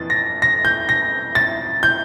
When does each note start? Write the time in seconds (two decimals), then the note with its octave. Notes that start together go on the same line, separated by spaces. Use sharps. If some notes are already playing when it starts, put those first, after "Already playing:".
Already playing: F2 E3 A6
0.10 A#6
0.42 A#6
0.65 G6
0.89 A#6
1.35 A6
1.83 G6